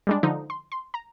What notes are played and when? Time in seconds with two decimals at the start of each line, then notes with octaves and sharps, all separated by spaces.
0.07 G3 G#3 D4
0.23 D3 F3 D#4
0.50 C6
0.72 C6
0.94 A#5